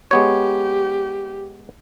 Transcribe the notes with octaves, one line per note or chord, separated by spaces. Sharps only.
G#3 B3 G4 C#5